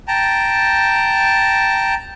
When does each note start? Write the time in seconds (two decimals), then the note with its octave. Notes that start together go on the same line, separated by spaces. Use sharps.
0.08 G5 A5 A#5